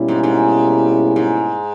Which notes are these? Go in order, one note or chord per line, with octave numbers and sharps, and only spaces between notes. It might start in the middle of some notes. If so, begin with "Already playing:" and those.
Already playing: B2 G3 A#3 C#4 E4
G#2
G#2
G#2